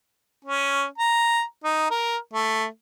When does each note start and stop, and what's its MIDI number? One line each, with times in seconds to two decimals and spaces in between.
0.45 0.85 61
0.98 1.42 82
1.64 1.89 63
1.90 2.17 70
2.34 2.66 57